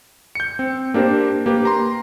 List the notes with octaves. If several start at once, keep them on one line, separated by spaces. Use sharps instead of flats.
G6 C#7
C4
A#3 D4 G4 A#4 C5
A#3 G4 B4
A#5 C6